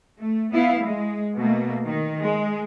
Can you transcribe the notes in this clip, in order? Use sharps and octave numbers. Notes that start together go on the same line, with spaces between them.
A3
B3 E4 F5
G#3
B2 A3 A#3
D#3
G#3